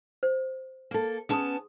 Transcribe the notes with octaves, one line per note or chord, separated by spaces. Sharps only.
C5
A#3 A4
B3 C#4 G#4 A5 C6 D#6